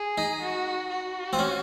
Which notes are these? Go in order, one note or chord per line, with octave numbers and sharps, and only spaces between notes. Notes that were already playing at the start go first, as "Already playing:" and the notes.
Already playing: G#4
D#4
F#4
F#4
C4
C#4